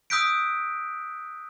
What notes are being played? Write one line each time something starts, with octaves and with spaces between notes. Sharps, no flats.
D#6 E6 F#6 G6 B6 D7